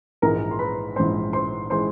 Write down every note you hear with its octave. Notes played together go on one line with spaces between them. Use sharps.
A#1 G#2 E3 G#3 A#4 A#5
C6
B4 B5
A#1 G#2 E3 G#3 C5 C6
C5 C6
E3 G#3 C5 C6